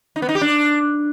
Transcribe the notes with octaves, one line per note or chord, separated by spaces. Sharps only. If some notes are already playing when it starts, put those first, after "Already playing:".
D#4
B3
D#4
G4
D4